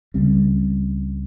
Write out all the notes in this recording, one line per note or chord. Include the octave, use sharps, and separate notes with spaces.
C#2 C#3 G3 C4